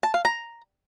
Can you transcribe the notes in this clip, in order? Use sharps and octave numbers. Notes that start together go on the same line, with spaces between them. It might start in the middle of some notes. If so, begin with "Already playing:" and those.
A5
F5
A#5